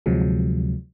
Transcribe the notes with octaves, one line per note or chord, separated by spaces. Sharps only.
D2 C3 F3 F#3 G#3